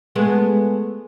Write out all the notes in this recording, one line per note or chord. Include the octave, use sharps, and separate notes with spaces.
G#3 A3 B3